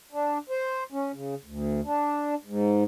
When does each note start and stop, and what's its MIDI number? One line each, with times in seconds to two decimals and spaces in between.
0.12 0.38 62
0.49 0.84 72
0.92 1.12 61
1.13 1.35 49
1.45 1.81 38
1.85 2.35 62
2.44 2.84 44